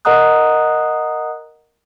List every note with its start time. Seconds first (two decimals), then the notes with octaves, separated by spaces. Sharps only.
0.05 A#4 D#5 F#5 A#5 D#6 F#6